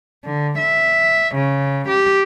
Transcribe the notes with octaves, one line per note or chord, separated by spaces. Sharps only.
D3
E5
C#3
G4